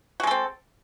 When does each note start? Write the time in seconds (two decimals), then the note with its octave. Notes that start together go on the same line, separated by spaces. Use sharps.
0.20 F#4
0.23 G#3
0.27 A4
0.31 C4